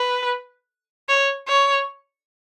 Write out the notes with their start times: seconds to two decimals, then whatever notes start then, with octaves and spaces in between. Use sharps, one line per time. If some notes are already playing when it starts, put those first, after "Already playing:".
Already playing: B4
1.09 C#5
1.48 C#5